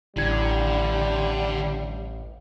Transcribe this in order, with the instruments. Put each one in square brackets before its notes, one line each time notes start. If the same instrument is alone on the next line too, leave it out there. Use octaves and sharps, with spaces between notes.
[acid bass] A1 [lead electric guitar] D3 [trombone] G3 [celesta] E4 G#6